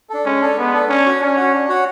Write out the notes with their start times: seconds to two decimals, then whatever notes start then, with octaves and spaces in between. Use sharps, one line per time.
0.10 D4 A4
0.25 G#3 C#4
0.41 D4 A4
0.58 G#3 B3
0.74 D4 A4
0.89 C#4 D4
1.05 F#4 C#5 F#5
1.21 C#4 D4
1.37 F#4 C#5 F#5
1.53 D4
1.69 F#4 C#5 F#5